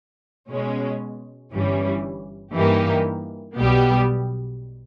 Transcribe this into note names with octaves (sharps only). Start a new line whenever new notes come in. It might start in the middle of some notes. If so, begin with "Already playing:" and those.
B2 G#3 C#4
G1 G2 E3 G3 C#4
G2 E3 A#3 D#4 G4
B1 B2 G3 B3 G4